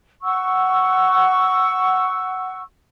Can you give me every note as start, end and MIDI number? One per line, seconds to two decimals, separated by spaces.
0.23 2.61 78
0.23 2.61 85
0.23 2.61 88